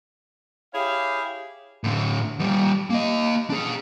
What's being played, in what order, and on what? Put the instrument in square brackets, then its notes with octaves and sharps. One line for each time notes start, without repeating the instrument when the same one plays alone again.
[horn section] E4 G4 G#4 C#5 F5
[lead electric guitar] A2 D3
D#3 G3
A#3 D#5
D4 G#4